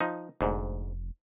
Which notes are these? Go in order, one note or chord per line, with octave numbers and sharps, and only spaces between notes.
F3 D#4
F1 D2 G#2